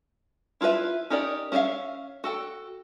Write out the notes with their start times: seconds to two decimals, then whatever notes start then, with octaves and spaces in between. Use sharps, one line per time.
0.61 E4 F4 A4 B4 E5
1.10 C#4 D#4 G4 A#4 D5
1.52 C#4 E4 F4 E5 F5
2.24 F#4 A4 G5